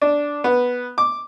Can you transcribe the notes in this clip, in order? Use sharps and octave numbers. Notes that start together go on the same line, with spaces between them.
D4
B3
D6